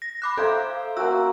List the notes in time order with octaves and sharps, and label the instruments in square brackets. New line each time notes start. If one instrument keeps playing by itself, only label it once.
[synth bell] A#6
B5 D6 F#6
[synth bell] A4 F5 [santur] C5 E5 A#5
[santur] A#3 C#4 F#4 [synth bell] E6